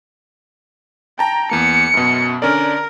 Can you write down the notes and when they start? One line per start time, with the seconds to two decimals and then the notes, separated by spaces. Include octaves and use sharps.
1.19 G5 A5 A#5
1.51 E2 A#3 C#7
1.94 F#2 B2
2.42 D3 C#4 A#4 D5